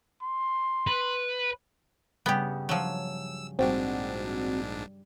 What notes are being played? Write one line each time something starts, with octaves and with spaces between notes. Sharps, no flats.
C6
B4
G2 C#3 G3 B3 G4
F3 F#3 E6
A#1 G#2 G3 C4 D4 F#4 D5